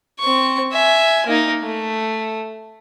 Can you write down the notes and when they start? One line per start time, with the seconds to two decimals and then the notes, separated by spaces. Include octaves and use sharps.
0.20 C4 C#6
0.72 E5 G#5
1.26 A#3 D#4
1.63 A3